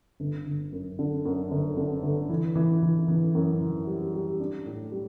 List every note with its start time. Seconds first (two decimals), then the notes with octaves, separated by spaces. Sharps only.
0.20 G1
0.46 G1
0.72 F#2
0.99 D3
1.25 F#2
1.51 G1
1.77 D3
2.03 G1
2.29 E3
2.55 E3
2.83 E3
3.08 E3
3.35 F#2
3.61 E3
3.87 G3
4.14 G3
4.40 D4
4.66 A2
4.92 G3